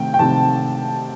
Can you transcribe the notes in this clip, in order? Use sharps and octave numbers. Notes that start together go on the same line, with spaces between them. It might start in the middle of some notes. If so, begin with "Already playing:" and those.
Already playing: C3 D#3 A3 C4 G5
G5
C3 D#3 A3 C4 A5